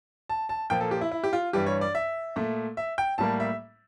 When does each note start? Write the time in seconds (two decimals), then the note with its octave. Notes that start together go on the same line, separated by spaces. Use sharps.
0.29 A5
0.49 A5
0.70 A#2 F3 A#3 G5
0.80 A4
0.91 G4
1.01 E4
1.12 E4
1.24 G4
1.33 F4
1.53 G2 E3 G3 G4
1.66 C#5
1.81 D5
1.95 E5
2.36 A#2 A3
2.77 E5
2.98 G5
3.18 A2 G3 A#3 A5
3.40 E5